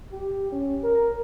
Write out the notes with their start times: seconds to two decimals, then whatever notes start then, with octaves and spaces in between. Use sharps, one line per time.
0.12 G4
0.52 C#4
0.84 A#4